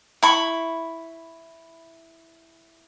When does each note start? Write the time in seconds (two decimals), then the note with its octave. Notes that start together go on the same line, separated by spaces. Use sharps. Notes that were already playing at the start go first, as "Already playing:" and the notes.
0.23 E4 B5 C#6